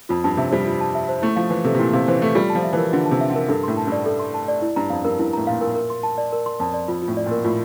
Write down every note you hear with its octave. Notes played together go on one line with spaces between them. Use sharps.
F2 F4
G2 A5
C3 E5
G3 C5
F4
A5
E5
C5
A3 E4
F3 F5
E3 C5
C3 A4
C3
A#2 E4
C3 F5
E3 C5
A3 A4
G3 F4
A5
F3
E5
E3 A#4
D3 F4
A5
C3
E5
D3
A#4
G2 A4
A2 C6
A5
G2
D5
A4
C6
A5
D5
E4
G2 A#5
F2 F5
G2 A#4
G2 E4
A2 A#5
A#2 F5
A#2 A#4
A#4
C6
A5
D5
A#4
C6
F2 A5
D5
F2 F4
F4
A2
D5
A#2
A#4
A2 F4